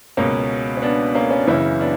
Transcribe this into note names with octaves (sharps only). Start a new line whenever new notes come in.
C#2 B2 A#3 C#4
C#4
B3 D4
A#3 C#4
C#4
D4
F#1 F#2 C#3 E3 C#4 E4
B3 D4